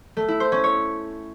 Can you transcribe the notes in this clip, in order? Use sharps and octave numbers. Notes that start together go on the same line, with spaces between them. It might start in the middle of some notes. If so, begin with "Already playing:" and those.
A3
E4
C5
C#4
C#5